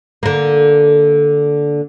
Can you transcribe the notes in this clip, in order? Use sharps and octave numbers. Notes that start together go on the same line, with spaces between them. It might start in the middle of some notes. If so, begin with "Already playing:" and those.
D3 A#3